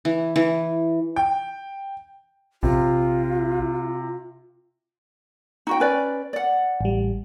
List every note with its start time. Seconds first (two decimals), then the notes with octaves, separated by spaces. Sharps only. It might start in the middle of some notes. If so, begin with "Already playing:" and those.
0.05 E3
0.36 E3
1.16 G5
2.63 A#1 C3 F4
5.67 D#4 F#4 G5
5.80 C#4 B4 D5
6.33 D5 F#5
6.81 A1 G3